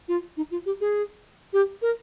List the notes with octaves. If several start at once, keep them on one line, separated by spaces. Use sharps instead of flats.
F4
D#4
F4
G4
G#4
G4
A#4